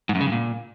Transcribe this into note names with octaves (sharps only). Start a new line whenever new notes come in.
G#2
F#2
C#3
G2
A#2